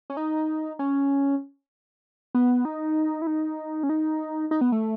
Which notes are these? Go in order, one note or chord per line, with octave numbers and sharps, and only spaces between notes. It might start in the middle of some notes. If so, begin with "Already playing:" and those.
C#4
D#4
C#4
B3
D#4
E4
D#4
C#4
D#4
D#4
B3
A3